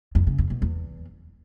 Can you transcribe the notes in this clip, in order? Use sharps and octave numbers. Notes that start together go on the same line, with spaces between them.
F2
C#3
F2
B2
E2